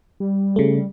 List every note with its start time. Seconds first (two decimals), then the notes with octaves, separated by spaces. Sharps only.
0.20 G3
0.56 C#3 A3